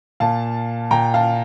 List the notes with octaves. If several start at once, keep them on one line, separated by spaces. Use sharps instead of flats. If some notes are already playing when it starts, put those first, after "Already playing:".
A#2 F5 A5
A#2 G5 A#5
F5 A5